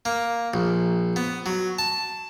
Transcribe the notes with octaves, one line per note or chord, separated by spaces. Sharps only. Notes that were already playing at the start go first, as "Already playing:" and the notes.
A#3
A#1
B3
F#3
A5